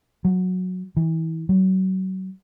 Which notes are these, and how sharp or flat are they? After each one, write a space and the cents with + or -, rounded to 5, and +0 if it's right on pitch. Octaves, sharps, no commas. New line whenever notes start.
F#3 -10
E3 -30
F#3 +30